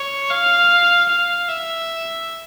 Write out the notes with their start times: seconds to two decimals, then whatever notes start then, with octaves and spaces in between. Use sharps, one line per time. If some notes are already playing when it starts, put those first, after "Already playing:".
Already playing: C#5
0.31 F5
1.09 F5
1.48 E5